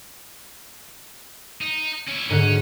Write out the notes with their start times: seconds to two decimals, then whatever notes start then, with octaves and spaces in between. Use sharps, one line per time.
1.61 D#4
2.07 C#4 E4
2.30 G#2 D3 C#4 F#4